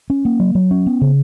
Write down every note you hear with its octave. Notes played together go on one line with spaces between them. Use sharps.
C#4
A#3
F#3
F#3
C#4
B3
C#3